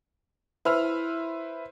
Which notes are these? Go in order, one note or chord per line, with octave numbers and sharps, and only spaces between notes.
E4 B4 C5 E6 F6 F7